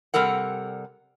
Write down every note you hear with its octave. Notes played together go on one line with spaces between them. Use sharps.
C3 G3 A4 A#4 F#5